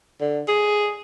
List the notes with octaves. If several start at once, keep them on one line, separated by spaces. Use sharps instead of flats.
D3
G#4